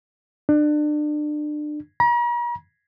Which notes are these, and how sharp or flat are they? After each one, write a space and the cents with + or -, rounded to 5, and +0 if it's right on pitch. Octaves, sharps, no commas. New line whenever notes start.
D4 +30
A#5 +45